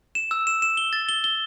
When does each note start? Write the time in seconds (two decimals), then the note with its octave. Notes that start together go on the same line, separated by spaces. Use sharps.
0.15 E7
0.31 E6
0.47 E7
0.62 E7
0.77 G7
0.93 A6
1.09 G7
1.24 G7